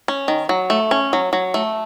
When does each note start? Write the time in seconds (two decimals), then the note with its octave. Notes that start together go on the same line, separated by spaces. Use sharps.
0.08 C#4
0.28 D#3
0.49 F#3
0.70 A3
0.91 C#4
1.13 F#3
1.33 F#3
1.54 A3